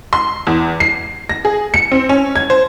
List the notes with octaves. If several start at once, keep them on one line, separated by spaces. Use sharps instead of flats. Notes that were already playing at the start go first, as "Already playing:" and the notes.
C6
E2
C7
A#6
G#4
C#7
C4
C#4
G#6
C5